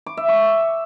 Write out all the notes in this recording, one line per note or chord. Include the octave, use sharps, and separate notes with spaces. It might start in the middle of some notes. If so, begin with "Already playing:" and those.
D6
E5
C#6